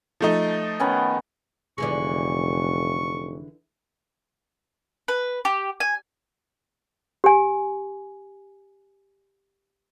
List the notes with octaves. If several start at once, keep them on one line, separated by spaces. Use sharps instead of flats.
F3 A3 D#4
D#3 B3 C#4
F1 D3 E3 G#3 C#6
B4
G4
G#5
G4 G#5